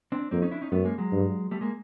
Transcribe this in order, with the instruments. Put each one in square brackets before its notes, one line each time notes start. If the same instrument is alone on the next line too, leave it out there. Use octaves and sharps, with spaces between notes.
[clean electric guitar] C4 D4
[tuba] F2 [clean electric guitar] A#3 C4
[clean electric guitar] C#4 D#4
D4 E4
C#4 D#4
[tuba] F#2 [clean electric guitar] A3 B3
[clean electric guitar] G#3 A#3
F#3 G#3
[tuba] G2
[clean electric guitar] G3 A3
G#3 A#3